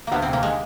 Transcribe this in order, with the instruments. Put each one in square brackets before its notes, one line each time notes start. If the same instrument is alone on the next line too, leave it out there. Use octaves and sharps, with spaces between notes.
[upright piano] D2 [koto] A#3 B3
[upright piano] C3 [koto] C4
[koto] A#3
G#3